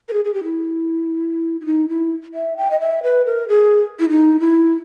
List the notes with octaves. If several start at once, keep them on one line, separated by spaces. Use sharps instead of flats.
A#4
G#4
G#4
G4
E4
E4
D#4
E4
E5
G5
D#5
E5
B4
A#4
G#4
E4
D#4
E4